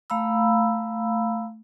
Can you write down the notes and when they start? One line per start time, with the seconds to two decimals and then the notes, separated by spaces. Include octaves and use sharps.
0.10 A3 F5 A#5 B5 E6